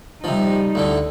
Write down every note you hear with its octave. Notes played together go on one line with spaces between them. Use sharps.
C3 F3 G3 D#4
D2 A2 D3